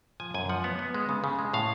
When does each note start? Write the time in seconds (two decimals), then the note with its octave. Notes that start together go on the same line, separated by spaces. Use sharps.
0.20 F3 G#5
0.34 F#2 G#5
0.49 F3 F#5
0.64 B3 F#5
0.79 B3
0.94 G#3
1.09 C#3
1.24 C#3
1.39 G#3
1.53 A2 F5